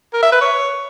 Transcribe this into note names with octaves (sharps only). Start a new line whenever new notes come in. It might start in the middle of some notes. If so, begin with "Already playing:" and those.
A#4
E5
B4
C#5